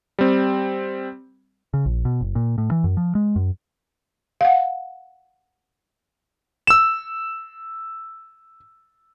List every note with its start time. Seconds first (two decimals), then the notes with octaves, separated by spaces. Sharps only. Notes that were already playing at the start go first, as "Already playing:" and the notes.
0.19 G3 C4
1.74 C#3
1.85 A#1
2.05 B2
2.21 F#1
2.35 A#2
2.58 A2
2.71 E3
2.84 F#2
2.97 F3
3.15 G#3
3.36 F#2
4.41 F5 F#5
6.67 E6 E7